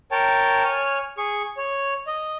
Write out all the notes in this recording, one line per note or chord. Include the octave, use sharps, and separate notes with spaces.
A#4 C#5 G5 A5
C#5 G#5 F6
G#4 C#6
C#5
D#5